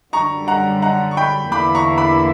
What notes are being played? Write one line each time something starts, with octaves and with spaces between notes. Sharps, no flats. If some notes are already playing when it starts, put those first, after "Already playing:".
F#2 D3 G3 A#5 C#6
F#5 A#5
F#5 A#5
C#6
G5 B5
E2 D3 A#3 E4 B5 D6
A#5 C#6
B5 D6